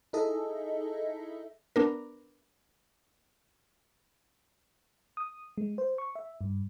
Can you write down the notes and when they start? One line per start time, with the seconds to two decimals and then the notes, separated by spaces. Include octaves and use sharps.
0.13 D#4 E4 G#4 A4 D#5 E5
1.76 B3 D4 A#4
5.17 D#6
5.58 G#3
5.78 C5
5.98 C#6
6.15 E5
6.41 G2